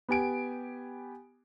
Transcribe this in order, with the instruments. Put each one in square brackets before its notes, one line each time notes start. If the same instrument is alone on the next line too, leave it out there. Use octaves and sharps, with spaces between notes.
[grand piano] B3 G4 G#5 D7